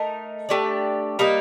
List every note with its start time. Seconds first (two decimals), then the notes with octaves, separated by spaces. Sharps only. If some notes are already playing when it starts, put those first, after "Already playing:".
Already playing: A3 D#4 A#4
0.49 A3 D4 G4 D5
1.19 G3 A#3 D#4 A#4